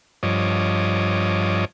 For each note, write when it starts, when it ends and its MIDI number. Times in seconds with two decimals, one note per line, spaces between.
0.23 1.65 43
0.23 1.65 53
0.23 1.65 73
0.23 1.65 75
0.23 1.65 86